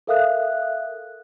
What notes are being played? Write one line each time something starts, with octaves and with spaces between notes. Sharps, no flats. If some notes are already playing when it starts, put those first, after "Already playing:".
A4 A#4 E5 F5 D#6 F#6